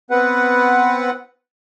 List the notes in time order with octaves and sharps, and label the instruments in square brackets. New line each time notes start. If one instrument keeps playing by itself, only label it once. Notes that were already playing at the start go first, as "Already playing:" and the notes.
[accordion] B3 C4 B4 F#5